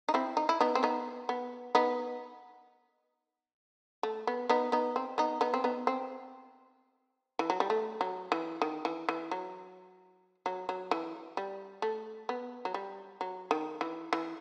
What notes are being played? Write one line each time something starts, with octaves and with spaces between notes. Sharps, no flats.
D#4
C4 E4
D#4
E4
B3 D#4
C4
B3 D#4
B3
B3 D#4
A3
B3
B3 D#4
B3 D#4
C4
B3 D#4
B3 D#4
C4
B3 D#4
C4
E3
F#3
G3
A3
F#3
E3
D#3
E3
E3
F#3
F#3
F#3
E3
G3
A3
B3
F#3
G3
F#3
D#3
E3
E3